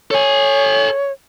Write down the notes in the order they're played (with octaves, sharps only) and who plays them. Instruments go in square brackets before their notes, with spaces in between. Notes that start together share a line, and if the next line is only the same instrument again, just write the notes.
[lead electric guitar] A4 G#5 [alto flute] C#5